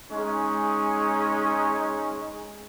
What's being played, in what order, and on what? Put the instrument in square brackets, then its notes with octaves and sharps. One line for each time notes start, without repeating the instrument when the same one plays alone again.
[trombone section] G#3 C#4 D#4